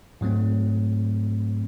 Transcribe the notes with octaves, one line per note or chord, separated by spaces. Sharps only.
G#2 F#3 A3 C4